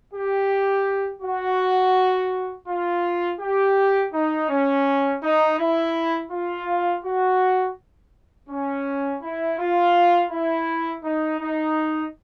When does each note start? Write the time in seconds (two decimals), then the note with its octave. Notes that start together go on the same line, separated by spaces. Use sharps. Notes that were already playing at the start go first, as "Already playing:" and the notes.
0.14 G4
1.22 F#4
2.68 F4
3.40 G4
4.13 D#4
4.50 C#4
5.22 D#4
5.59 E4
6.31 F4
7.04 F#4
8.50 C#4
9.22 E4
9.59 F4
10.31 E4
11.04 D#4
11.40 D#4